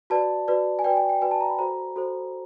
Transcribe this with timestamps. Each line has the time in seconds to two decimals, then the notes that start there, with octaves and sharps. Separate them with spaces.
0.10 F#4 B4 D5 A5
0.48 F#4 B4 D5
0.79 G#5
0.84 F#4 B4 D5 G5
0.97 G#5
1.09 G5
1.22 F#4 B4 D5 G#5
1.31 A5
1.40 A#5
1.50 B5
1.59 F#4 A4 C5 A#5
1.96 F#4 A4 C5